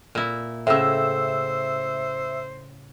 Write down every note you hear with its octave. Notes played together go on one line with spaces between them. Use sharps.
A#2 E4
A2 C#3 C5 E5 E6